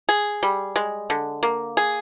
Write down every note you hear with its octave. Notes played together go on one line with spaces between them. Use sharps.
G#4
G3
G#3
D3
A#3
G#4